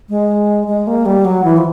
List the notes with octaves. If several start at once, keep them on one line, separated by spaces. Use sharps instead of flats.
G#3
G#3
A#3
G3
F#3
E3
F3